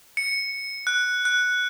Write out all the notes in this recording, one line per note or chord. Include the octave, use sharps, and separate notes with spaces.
C#7
F#6
F#6